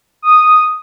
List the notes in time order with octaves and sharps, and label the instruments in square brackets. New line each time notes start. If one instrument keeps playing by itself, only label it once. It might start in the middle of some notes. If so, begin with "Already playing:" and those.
[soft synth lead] D#6